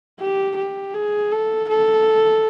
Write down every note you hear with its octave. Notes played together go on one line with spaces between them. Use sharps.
G4
G4
G#4
A4
A4